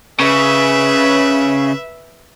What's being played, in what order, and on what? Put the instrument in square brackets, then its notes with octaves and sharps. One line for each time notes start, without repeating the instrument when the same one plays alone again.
[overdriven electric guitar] C#3 [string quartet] B4 E5